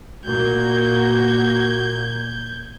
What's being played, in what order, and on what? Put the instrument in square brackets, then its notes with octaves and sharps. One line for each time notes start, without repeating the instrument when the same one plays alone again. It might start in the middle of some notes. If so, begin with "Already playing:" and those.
[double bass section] A#2 A#3 [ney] F#4 [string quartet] G6 G#6